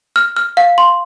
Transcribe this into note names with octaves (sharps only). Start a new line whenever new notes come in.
F6
F6
F5
C6